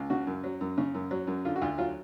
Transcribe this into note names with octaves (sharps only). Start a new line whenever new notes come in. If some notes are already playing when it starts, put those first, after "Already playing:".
Already playing: C#2
C#3 F#4
F#2
F#3
F#2
C#3
F#2
F#3
F#2
D3 F4
F#4
D2 F4
F#3 F4